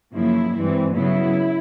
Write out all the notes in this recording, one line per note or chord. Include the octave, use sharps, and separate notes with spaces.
F#2 C#3 F3 A#3 E4
G2 E3 G#3 C4
C#3 F#3 B3 E4